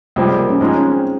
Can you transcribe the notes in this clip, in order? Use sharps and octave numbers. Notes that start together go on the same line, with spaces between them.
C#2 C3 F3 G3 C4
G#3
A#3
C#4
G#2 F3 G#3 D#4
C#4
C4